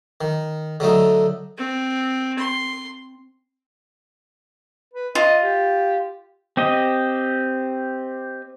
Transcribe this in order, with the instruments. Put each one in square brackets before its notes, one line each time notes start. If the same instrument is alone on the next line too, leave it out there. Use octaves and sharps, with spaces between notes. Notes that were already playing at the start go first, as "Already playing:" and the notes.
[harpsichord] D#3
D3 F#3 A3 D#4
[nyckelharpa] C4
C6
[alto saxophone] B4
[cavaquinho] F4 [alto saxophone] D#5
[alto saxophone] G4
[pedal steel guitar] C4 G4 D#5